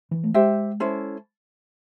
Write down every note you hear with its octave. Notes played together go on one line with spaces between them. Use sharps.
E3
A3
G#3 G4 C5 E5 G5
C#4 E4 A4 C5